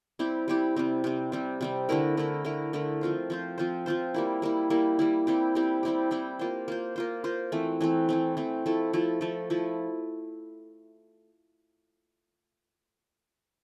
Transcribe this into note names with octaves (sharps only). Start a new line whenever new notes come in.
G3 C4 E4 G4
G3 C4 E4 G4
C3 G3 C4
C3 G3 C4
C3 G3 C4
C3 G3 C4
D3 A3 E4 A#4
D3 A3 E4 A#4
D3 A3 E4 A#4
D3 A3 E4 A#4
F3 C4 F4 C5
F3 C4 F4 C5
F3 C4 F4 C5
F3 C4 F4 C5
G3 A#3 E4
G3 A#3 E4
G3 A#3 E4
G3 A#3 E4
G3 C4 E4 G4
G3 C4 E4 G4
G3 C4 E4 G4
G3 C4 E4 G4
A#3 F4 C5
A#3 F4 C5
A#3 F4 C5
A#3 F4 C5
E3 A3 C4
E3 A3 C4
E3 A3 C4
E3 A3 C4
F3 A3 E4 A4
F3 A3 E4 A4
F3 A3 E4 A4
F3 A3 E4 A4